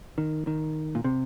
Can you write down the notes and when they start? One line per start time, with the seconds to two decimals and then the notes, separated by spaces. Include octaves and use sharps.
0.18 D#3
0.47 D#3
0.95 A#2
1.04 C3